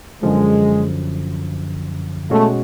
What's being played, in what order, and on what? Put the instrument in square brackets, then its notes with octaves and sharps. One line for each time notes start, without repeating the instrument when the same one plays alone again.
[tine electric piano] F#2 D3 F3 [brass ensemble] G#3
[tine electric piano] B2 G#3 C#4 F#4 [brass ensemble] A3